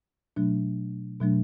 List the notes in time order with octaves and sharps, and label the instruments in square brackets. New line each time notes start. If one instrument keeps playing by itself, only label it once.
[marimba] B2 F#3 A3 D4
B2 F#3 A3 D4